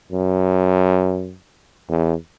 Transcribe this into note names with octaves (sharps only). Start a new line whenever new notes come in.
F#2
E2